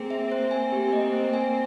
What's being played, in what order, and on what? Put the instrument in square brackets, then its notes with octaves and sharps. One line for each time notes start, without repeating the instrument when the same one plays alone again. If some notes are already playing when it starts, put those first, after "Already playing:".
Already playing: [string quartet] A#3 C4 [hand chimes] G#4
[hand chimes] E5
C5
G#5
G4
D#5
C5
G#5